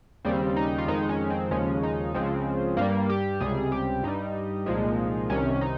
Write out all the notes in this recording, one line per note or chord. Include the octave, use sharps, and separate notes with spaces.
D#2 C#3 G3 C4
D#4
F4
F2 D#3 G#3 D#4
C#4
C4
D#2 C#3 F3 G#3 C#4
D#4
C#2 C#3 F3 G#3 C4
G2 G3 A#3
G4
C#2 C3 G3 G#4
G4
G2 G3 D#4
C2 A#2 F3 G#3
C2 C3 D#3 C#4
D#4